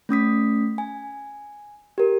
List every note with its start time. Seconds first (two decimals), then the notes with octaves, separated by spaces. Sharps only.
0.09 A3 C#4 D#6 B6
0.78 G#5
1.98 G4 A#4